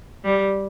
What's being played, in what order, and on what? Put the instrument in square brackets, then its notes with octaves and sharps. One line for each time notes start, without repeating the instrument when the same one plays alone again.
[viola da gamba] G3